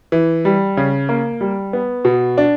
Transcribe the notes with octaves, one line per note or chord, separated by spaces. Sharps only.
E3
G3
C#3
A#3
G3
B3
B2
D4